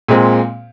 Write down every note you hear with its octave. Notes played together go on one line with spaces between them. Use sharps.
A#2 G#3 C4